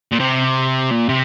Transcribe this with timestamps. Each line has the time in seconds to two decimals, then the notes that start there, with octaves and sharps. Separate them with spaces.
0.12 A#2
0.20 C3
0.91 A#2
1.09 C3